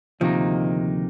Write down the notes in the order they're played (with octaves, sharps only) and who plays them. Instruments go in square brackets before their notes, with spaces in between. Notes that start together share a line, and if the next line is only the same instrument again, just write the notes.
[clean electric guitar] D2 C3 D#3 A#3 D#4 [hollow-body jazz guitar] F3